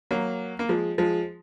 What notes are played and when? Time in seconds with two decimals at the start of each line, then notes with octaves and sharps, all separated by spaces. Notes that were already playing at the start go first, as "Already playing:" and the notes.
0.11 F#3 A#3
0.59 A#3
0.69 F3 G#3
0.98 F3 G#3